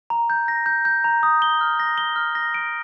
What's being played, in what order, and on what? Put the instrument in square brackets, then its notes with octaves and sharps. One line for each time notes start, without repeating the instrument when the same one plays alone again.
[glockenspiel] A#5
G6
A#6
G6
G6
A#5
D#6
G7
F6
A#6
G7
F6
A#6
D7